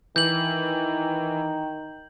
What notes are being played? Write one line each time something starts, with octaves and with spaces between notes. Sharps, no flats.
D#3 E3 G6 F#7